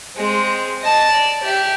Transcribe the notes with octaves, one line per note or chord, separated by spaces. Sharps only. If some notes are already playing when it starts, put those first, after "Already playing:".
G#3 C4
D#5 A5
D5
G4 E5